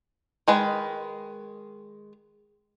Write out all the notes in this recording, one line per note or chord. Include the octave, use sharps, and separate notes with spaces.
D#3 G#3 B4